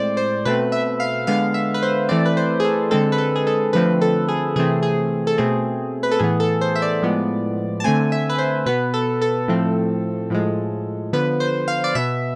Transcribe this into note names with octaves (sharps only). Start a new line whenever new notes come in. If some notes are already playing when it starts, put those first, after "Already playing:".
Already playing: A2 G#3 C4 C5 D5
C5
B2 A3 C4 B4
E5
F5
D3 G#3 B3 F5
E5
B4
C5
E3 A3 C4 D5
B4
C5
G#4
A4
D3 G#3 C4 A4
B4
A4
G#4
A4
D3 F3 A3 C4 B4
A4
G#4
C3 E3 A3 C4 G#4
G#4
A4
B2 A3 C4 G#4
B4
A4
A2 E3 B3 G#4
A4
C5
E5
D5
A2 F3 G#3 B3
A5
D3 A3 C4 G#5
E5
B4
C5
B2 B3 B4
A4
A4
A2 F3 A3 C4
A2 F3 G#3
D3 F3 B3 B4
C5
F5
D5
B2 B3 E5